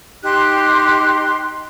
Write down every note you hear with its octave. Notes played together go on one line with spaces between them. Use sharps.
D#4 G4 C6 F#6